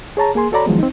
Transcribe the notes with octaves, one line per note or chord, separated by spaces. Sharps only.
G#4 C#5 A5 A#5
A#3 G#4 G#5 C6
F#4 A4 C#5 D5 A#5 B5
D#3 F3 F#3 G#3 B3
C4 D#4